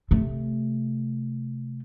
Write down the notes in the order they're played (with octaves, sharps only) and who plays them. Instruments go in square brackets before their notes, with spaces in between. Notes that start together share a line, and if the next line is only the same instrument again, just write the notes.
[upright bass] C3 A3